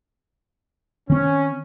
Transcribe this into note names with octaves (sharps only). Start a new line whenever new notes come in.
D#3 C4 C#4